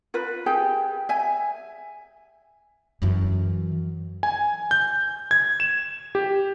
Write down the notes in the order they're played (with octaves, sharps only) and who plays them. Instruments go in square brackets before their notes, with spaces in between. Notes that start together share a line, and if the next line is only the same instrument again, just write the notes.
[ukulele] F4 A#4 B4 B5
G4 G#4 G5 G#5
E5 G#5
[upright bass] F#2 E3
[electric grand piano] G#5
G6
G#6
E7
G4